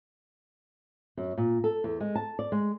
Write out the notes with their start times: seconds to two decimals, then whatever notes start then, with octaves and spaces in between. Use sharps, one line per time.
1.17 F#2
1.38 A#2
1.64 A4
1.84 E2
2.00 G#3
2.15 A5
2.39 D5
2.52 G#3